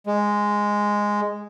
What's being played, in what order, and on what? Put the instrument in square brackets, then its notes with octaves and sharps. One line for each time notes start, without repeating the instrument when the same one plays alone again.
[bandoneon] G#3